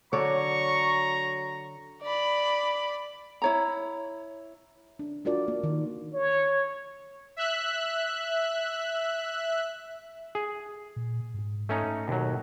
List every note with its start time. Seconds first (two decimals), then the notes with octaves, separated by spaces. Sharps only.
0.13 D3 F#3 C#5 D5 A#5 C#6
2.02 D5 B5
3.42 E4 C#5 A#5
4.99 D4
5.25 D4 F4 F#4 A#4 D5
5.48 A#3
5.64 D#3
6.14 C#5
7.36 E5 F#6
10.35 G#4
10.96 A#2
11.34 G#2
11.69 A3 C#4 D#4
12.08 D#2 B2 F#3